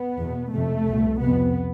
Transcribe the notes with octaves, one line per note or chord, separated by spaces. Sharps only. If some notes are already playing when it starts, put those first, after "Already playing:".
Already playing: B3
E2 B2
F2 C3 A3
C2 B2
F2 C3 B3